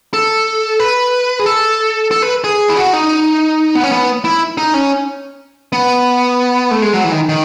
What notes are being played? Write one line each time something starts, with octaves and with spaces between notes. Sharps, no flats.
A4
B4
G#4
A4
A4
B4
G#4
E4
F#4
D#4
B3
C#4
B3
E4
D#4
C#4
B3
A3
G#3
F#3
E3
D#3
D#3